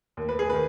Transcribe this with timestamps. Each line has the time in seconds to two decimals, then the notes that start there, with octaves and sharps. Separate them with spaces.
0.17 D#2
0.29 B4
0.39 G#4
0.49 D#3 B4